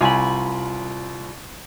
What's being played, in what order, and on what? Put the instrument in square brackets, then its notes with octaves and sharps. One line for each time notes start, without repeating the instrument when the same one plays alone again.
[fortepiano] C2 G#5 [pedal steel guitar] F4 B5